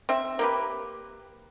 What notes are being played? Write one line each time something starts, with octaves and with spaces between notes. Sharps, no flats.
C4 E5
A#3 G4 B4